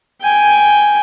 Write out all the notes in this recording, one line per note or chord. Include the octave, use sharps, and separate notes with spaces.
G5 G#5